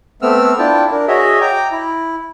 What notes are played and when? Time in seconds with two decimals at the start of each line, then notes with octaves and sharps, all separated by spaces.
0.22 A3 B3 C4 E6 F6
0.59 D4 E4 F4 G5 A5
0.92 D4 A#4
1.08 F#4 G#4 C#5 D#5 E5
1.41 G5 A#5 D6
1.72 E4